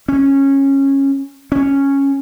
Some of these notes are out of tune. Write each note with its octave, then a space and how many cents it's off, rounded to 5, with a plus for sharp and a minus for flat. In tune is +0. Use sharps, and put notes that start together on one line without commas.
C#4 -15
C#4 -5